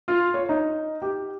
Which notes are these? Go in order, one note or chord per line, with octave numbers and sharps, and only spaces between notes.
F4
C#5
D#4
G4